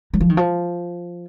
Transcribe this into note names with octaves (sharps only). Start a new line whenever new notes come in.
F#3
F3
D#3
F3